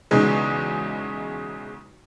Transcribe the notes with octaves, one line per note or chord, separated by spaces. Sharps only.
B1 E2 C#3 G#3